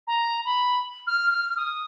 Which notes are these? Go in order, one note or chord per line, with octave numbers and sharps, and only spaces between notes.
A#5
B5
F6
F6
F6
D#6